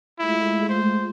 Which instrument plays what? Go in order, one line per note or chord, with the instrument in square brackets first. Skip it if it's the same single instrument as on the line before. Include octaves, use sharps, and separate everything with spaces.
[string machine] G#3 A3 F4 [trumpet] E4
[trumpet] C5